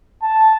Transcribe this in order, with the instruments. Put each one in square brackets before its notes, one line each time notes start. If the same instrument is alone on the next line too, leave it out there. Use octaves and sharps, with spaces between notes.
[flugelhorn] A5